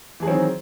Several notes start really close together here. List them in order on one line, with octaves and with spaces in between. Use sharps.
E3 G#4 F#3 C4 D#3